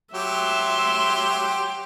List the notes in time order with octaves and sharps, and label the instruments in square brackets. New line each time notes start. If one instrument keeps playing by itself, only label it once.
[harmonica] F#3 G4 [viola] E5 C6